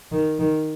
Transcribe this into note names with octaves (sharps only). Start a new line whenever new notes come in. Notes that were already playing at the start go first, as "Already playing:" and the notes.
D#3
D#3